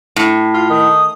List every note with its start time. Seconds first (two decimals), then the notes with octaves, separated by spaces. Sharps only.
0.16 A2
0.54 F4
0.70 D#3 D#6